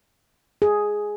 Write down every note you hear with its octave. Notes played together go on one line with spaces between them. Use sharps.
G#4